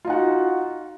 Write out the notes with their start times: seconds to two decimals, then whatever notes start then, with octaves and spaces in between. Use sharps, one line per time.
0.05 F4
0.07 D#4
0.10 F#5
0.13 F#4